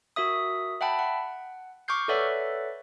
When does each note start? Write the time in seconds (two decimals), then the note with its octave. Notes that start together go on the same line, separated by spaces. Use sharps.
0.16 F#4 A#4 E5 D#6
0.81 E5 F#5 G5 A5 B5
0.99 F#5
1.88 C#6 D6 F6 G6 C7
2.08 A4 B4 C#5 D5 E5 F#5